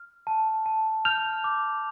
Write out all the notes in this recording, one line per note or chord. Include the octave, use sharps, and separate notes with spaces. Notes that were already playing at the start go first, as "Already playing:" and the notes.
Already playing: F6
A5
A5
F6 G6 F7
D6